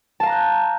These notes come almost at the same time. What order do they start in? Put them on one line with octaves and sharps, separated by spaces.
A5 F5 A#5 F#6 G6